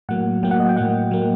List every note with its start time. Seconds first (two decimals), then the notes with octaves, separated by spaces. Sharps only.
0.09 A2 F#3 A#3 F#5
0.43 A2 F#3 A#3 G5
0.51 F#5
0.60 D#5
0.69 G5
0.76 A2 F#3 A#3 F#5
1.11 A2 F#3 A#3